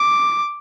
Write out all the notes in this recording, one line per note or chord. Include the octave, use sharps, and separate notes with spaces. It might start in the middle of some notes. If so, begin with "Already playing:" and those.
Already playing: D6